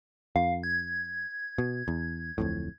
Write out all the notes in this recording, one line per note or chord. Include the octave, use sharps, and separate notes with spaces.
F2 F5
G#6
B2
E2
D1 F2 A2